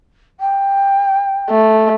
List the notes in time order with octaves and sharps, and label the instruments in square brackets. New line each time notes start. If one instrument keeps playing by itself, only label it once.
[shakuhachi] G5
[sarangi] A3